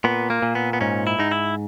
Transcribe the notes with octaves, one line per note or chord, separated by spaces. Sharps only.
A#2 B3
A#3
A#2
B3
B3
G#2 C#4
E4
G#2 D#4
E4